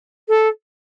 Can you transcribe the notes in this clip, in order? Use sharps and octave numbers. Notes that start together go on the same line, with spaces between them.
A4